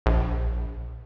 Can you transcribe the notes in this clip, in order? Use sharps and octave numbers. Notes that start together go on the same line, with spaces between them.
A#1